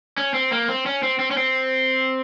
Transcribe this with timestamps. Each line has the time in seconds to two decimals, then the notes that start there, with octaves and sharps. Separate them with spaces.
0.17 C#4
0.34 C4
0.52 A#3
0.68 C4
0.86 C#4
1.03 C4
1.19 C4
1.31 C#4
1.37 C4